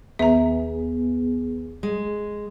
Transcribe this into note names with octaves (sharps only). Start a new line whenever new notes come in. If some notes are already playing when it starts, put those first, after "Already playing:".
D#2 B3 G#4 E5 A#5
G#3